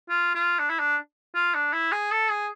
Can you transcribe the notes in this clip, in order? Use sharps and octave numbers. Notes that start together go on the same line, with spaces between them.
F4
F4
D4
E4
D4
F4
D4
E4
G#4
A4
G#4